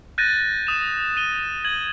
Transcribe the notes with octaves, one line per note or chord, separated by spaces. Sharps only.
F#6 G6 A6 A#6 D#7
D#6 E7
D#7 G7
G#6 F#7